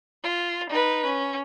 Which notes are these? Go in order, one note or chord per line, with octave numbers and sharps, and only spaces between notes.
F4
D#4 B4
C#4